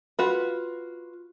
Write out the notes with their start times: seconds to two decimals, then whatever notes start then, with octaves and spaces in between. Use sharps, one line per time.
0.19 F4 F#4 B4